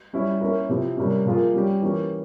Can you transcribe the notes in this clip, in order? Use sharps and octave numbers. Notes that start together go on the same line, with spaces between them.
G3 C#4 E4
A#3 C#4 E4 A#4
C3 F3 C4 E4 G4
C3 G3 A#3 C#4
C3 F3 A#3 F4 G#4
G3 C#4 G4
E3 A#3 C#4 G4